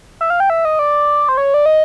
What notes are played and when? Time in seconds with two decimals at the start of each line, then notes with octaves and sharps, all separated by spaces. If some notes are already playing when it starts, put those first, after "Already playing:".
0.21 E5
0.30 F5
0.40 G5
0.50 E5
0.65 D#5
0.79 D5
1.29 C5
1.37 C#5
1.54 D5
1.66 D#5